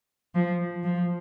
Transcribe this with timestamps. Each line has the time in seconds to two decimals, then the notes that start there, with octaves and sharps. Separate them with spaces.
0.34 F3
0.83 F3